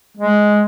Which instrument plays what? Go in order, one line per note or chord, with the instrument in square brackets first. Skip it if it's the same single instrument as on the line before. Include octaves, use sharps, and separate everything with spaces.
[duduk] G#3